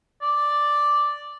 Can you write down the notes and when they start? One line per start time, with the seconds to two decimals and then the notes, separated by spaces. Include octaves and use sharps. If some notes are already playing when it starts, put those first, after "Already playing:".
0.22 D5